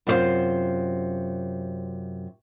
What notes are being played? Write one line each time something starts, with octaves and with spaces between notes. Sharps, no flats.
F#2 C3 E4 F4 C5